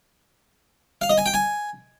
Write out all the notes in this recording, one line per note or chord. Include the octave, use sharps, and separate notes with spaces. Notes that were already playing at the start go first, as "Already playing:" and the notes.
F5
D#5
G#5
G5
G#5